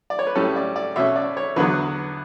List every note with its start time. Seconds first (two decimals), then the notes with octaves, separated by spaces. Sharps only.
0.10 D5
0.19 C#5
0.27 B4
0.35 A2 G3 C#4 A4
0.56 D5
0.76 D5
0.96 B2 A3 C#4 E5
1.16 D5
1.37 C#5
1.56 E2 D3 F#3 B3 B4